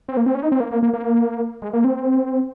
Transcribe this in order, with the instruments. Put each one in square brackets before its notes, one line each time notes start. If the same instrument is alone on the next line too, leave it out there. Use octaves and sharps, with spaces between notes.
[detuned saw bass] C4
A#3
C4
C#4
D#4
C4
A#3
A#3
A#3
A#3
G#3
A#3
C4